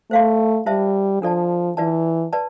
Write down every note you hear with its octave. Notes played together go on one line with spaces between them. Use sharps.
A3 C5 F5 C6
G3 F4 C5 E5 A5
F3 D4 A4 D5 A5
E3 F4 B4 D5 A5
B4 D5 A5